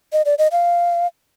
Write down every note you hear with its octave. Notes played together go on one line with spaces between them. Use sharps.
D#5
D5
D#5
F5